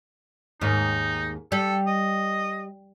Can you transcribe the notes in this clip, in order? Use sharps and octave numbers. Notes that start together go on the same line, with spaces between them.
D#2 G#2 D#4
G3 A4
D#5